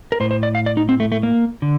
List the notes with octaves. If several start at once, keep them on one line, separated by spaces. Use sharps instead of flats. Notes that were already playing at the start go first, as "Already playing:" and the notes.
A#4
A2 C5
C5
D5
F5
D5
D#4
C4
A3
A3
A#3
D3